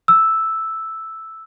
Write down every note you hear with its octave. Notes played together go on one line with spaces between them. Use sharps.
E6